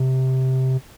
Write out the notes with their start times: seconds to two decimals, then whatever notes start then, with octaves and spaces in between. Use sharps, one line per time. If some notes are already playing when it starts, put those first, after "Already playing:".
Already playing: C3